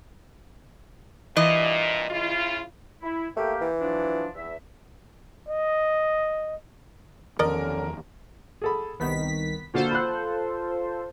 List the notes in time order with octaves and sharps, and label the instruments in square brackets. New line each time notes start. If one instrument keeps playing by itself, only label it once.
[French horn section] G2 A#2 [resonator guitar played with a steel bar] E3 D#5
[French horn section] C#3 E4 F4
[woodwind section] E4
[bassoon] A3 [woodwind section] A#3 G4 G5
[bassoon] E3
[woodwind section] F3 F#3 D4
E2 E5
[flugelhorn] D#5
[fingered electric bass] E2 D#3 F3 [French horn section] D3 C#4 [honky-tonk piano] A#4 [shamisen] D5 D#5
[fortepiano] G#4 A4 B5
[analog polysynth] C2 D#3 B6 [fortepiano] B3
[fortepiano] A#2 D3 F#4 [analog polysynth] F4 A4 C5
[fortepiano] B5 F#6